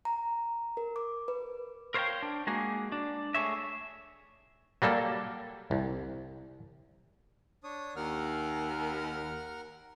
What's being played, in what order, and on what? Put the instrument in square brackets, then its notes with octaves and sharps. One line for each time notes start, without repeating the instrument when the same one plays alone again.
[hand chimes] A#5
A#4
D6
B4
[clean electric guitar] A#4 C5 C#5 E5 F5 G5
D4
G#3 A#3 F#4 G#4
D4
A3 G#4 C#5 E5
[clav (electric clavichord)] F#3 G3 A#3 A4
C2
[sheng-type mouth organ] D4 C#5 D#6
[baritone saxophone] D#2 [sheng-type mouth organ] A#4 F#5 F6